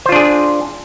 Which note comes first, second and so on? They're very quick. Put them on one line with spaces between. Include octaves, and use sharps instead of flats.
C5 F4 D4 G#4